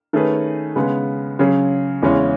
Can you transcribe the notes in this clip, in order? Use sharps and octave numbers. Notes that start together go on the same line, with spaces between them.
D#3 A3 C#4 G#4 B4
C#3 G#3 B3
C#3 F#3 C#4 G#4
E2 C#3 G#3 C#4 E4